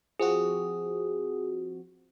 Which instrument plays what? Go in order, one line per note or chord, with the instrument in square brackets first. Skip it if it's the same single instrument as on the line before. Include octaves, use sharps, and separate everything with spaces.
[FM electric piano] F3 C4 F#4 [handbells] G#4